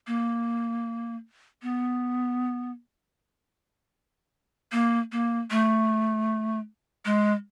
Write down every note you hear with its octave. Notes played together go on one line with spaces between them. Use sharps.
A#3
B3
A#3
A#3
A3
G#3